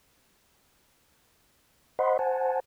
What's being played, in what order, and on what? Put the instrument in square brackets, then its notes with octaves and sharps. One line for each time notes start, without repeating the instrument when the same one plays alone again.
[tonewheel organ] C5 D#5 F#5 B5 C6
C5 F#5 G#5 A5